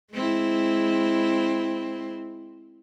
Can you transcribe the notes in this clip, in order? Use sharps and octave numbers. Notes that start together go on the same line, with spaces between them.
G#3 C4 E4